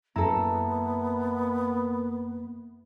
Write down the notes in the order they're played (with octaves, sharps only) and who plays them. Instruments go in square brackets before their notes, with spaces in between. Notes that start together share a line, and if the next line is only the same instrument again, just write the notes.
[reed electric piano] F#2 A#5 [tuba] A#3 [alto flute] B3 [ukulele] E4 A4